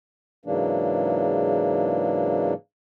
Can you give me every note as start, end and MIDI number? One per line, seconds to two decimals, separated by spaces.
0.45 2.53 44
0.45 2.53 49
0.45 2.53 52
0.45 2.53 54
0.45 2.53 58
0.45 2.53 62